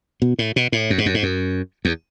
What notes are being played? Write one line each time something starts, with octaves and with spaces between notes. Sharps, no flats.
B2
A2
B2
A2
F#2
G#2
F#2
G#2
F#2
E2